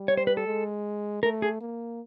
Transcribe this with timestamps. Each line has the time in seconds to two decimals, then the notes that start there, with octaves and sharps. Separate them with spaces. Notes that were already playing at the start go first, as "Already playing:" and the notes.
Already playing: G3
0.08 C#5
0.17 C5
0.27 B4
0.37 A4
0.47 G#3
1.23 A3 A#4
1.42 G#4
1.61 A#3